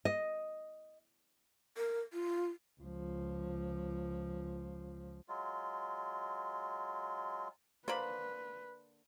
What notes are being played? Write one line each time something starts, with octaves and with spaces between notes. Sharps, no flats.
D#5
A#4
F4
C#2 F3
F#3 G#3 F4
D3 A#3 B4 C5 B5